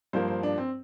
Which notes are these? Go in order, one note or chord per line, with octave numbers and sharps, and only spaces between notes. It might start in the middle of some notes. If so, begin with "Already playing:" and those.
G2 F3 A#3 C5
C5
D4
C4